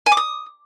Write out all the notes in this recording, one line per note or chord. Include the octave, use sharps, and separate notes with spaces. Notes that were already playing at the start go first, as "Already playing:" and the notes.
G#5
D6
D#6